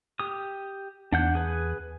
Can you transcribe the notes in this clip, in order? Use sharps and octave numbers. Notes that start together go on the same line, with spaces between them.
G4 D#6
E2 D4 F#5 G6
G#4 B4